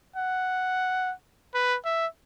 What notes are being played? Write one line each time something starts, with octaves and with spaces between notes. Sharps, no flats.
F#5
B4
E5